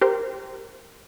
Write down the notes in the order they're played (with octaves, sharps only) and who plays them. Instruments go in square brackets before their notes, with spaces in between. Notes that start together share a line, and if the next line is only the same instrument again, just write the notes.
[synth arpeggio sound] G4 A#4 C5